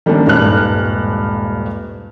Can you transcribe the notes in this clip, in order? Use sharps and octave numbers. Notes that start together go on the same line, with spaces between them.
D#3 G3 A3 A#3 C#4 D4
D#1 G#1 G2 F6 F#6